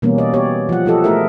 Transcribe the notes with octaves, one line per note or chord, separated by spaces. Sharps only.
B2 E3 G3 A#3 B3 C#4
D5 D#5
B3 G4 C#5 D5
F3 F#5
F3 F4 G4 A4 D#5
A3 E4 G#4 A#4 E5